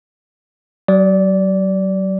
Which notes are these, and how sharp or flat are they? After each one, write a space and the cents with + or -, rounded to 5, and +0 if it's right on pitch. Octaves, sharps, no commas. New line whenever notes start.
F#3 +40 D5 -15